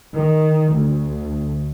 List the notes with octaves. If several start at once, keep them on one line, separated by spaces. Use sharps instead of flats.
D#3
D2